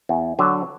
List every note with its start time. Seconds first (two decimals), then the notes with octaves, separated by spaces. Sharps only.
0.09 E2
0.39 D3 F#3